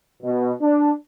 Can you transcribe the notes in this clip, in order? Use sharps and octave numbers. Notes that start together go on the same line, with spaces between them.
B2
D4